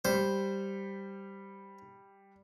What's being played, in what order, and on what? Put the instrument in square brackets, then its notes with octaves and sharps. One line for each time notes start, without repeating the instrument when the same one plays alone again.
[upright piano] G3 [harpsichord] C5